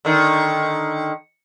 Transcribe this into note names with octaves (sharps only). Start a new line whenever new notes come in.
D3 D#3